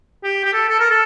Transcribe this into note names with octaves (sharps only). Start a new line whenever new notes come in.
G4
G4
A4
A4
A#4
A4